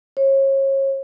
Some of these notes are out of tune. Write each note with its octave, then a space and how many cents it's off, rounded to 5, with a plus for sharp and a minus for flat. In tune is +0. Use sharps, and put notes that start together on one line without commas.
C#5 -35